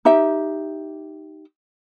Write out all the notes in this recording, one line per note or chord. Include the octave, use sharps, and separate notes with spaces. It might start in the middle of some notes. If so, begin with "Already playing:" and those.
D#4 G4 E5